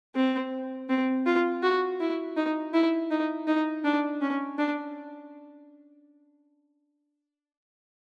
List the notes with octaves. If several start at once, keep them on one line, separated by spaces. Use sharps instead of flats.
C4
C4
F4
F#4
E4
D#4
E4
D#4
D#4
D4
C#4
D4